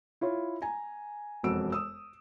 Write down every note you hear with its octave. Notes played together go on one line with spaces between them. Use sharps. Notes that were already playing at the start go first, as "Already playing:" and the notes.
E4 F4 C#5
G#5 A#5
E1 F2 F#4 E6 D7
D#6 E6